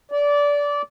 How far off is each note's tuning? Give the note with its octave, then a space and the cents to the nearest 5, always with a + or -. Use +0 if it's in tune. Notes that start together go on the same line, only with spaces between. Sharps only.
D5 -20